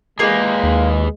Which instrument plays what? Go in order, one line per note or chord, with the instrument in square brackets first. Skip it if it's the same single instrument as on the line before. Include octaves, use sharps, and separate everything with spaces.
[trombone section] G#3 [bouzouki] A#3 F4 G4 [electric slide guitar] G#4 B4
[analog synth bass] D#2